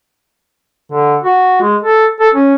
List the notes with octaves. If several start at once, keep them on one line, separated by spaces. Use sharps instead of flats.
D3
F#4
G#3
A4
A4
C#4